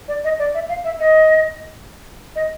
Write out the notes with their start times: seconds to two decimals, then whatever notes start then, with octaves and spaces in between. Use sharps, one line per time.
0.08 D5
0.24 D#5
0.39 D5
0.54 E5
0.69 F5
0.84 E5
1.00 D#5
2.36 D#5